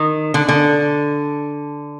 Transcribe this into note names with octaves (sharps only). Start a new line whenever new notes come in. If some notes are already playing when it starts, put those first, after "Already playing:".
Already playing: D#3
D3
D3